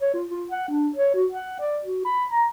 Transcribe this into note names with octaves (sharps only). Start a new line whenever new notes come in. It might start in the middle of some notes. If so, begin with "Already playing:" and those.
C#5
F4
F4
F#5
D4
C#5
F#4
F#5
D5
F#4
B5
A#5